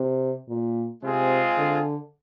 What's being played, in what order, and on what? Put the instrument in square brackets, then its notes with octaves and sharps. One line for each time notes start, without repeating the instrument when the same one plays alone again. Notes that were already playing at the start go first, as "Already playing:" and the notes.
Already playing: [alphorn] C3
A#2
[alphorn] C3 [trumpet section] G#3 C4 F4 G#4
[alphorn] D3